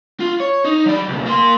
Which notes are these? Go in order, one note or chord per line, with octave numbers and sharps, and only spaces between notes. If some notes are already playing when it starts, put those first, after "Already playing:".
F4
C#5
D#4
F#3 D5
C#2 B2
A#3 C6